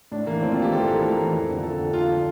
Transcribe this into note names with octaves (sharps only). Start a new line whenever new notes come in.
A2 D4
E3 A#3
A2 C4
F4
E3
G4
A2 A4
E3 A#4
A2 A#4
E3
F2
D3 F3
F2 A4
D3 F3
F2 F4
D3 F3